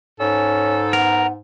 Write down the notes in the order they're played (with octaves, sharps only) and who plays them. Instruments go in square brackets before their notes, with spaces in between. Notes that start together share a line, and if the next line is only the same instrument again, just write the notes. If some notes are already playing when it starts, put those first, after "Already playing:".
[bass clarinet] G#2 [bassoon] C#4 [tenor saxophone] A4
[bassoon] B3 [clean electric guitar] A#4